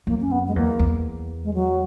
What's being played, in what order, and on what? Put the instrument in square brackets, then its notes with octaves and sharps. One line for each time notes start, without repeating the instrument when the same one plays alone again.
[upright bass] F#2 [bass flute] A#3
[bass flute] C#4
B3
G#3
[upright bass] E2 [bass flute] A#3
[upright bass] E2
[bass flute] G#3
F#3